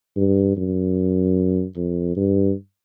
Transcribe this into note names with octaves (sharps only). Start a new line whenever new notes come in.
G2
F#2
F2
G2